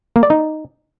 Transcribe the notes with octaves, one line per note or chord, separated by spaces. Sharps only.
A#3
D5
D#4